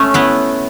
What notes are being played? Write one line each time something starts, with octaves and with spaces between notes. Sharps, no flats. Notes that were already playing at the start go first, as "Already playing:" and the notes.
Already playing: A3 C#4
B3 E4